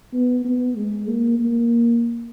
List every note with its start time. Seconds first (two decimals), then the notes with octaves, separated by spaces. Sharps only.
0.13 B3
0.45 B3
0.76 G#3
1.08 A#3
1.39 A#3